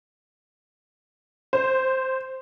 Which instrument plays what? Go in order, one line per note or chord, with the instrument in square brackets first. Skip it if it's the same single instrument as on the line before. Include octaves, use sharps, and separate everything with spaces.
[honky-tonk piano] C5